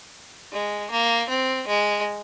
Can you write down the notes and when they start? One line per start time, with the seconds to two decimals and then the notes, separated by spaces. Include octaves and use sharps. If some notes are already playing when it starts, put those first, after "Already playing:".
0.53 G#3
0.91 A#3
1.29 C4
1.68 G#3